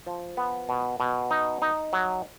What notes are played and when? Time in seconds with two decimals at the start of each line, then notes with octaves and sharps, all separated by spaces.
0.07 F3
0.37 B3
0.69 B2
1.00 B2
1.31 D#4
1.62 D#4
1.93 F#3